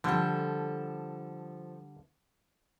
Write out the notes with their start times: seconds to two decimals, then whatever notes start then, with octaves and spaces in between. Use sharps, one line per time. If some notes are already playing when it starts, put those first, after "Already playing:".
0.04 D3 F3 G3 A4